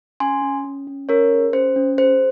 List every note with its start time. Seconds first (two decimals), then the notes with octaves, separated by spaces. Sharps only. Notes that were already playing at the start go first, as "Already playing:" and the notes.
0.20 C#4 G#5 C6
0.42 C#4
0.65 C#4
0.87 C#4
1.09 C#4 A#4 C#5
1.32 G#4
1.53 C#4 C5
1.76 C#4
1.98 G#4 C5